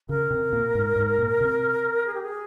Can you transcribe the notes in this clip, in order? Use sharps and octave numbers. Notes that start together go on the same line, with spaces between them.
C#3 A#4
C3
A#2
G#2
G#2
A#2
C3
G#4
G4
G#4